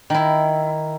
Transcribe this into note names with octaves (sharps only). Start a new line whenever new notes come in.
D#3 E4